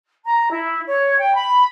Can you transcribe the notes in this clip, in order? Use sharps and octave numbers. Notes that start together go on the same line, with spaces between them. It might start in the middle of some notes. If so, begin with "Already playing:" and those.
A#5
E4
C#5
G5
B5